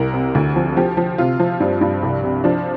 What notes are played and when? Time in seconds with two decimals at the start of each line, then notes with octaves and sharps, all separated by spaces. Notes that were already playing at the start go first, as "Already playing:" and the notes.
Already playing: C2 A#4
0.13 C3
0.35 D2
0.56 F3
0.77 F3 G4
0.97 F3
1.18 C3 F4
1.40 F3
1.60 G2
1.81 G2
2.03 C2
2.23 C3
2.44 F3 D4